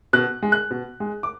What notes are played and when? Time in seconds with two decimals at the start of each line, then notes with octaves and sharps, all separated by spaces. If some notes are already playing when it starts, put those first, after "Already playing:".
0.13 B2 F#6
0.43 G#3
0.52 F#6
0.71 B2
1.00 G#3
1.23 D6